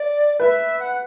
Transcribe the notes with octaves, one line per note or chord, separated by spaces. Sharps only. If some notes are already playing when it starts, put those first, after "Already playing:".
Already playing: D5
B4 E5
F#5